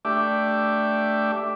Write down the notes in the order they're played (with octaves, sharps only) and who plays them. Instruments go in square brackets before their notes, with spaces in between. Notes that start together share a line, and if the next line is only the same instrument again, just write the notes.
[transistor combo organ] A3 D4 G4 D5 E5